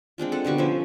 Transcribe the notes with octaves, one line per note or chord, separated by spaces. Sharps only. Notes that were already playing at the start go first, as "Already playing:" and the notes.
G#3 C4 D4 F4
A4 F#5
B2 D3 G3 C#6
F3 C#4 C5 E5